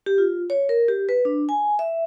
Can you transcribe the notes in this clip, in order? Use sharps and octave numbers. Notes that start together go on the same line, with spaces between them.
G4
F4
C#5
A#4
G4
B4
D4
G#5
E5